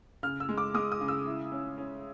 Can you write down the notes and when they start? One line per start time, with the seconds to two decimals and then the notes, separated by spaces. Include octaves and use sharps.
0.23 C#3 F6
0.40 E6
0.49 G#3
0.58 D6
0.74 G#3 D#6
0.92 D#6
1.01 C#3
1.08 E6
1.26 E4
1.52 C#4
1.78 C#4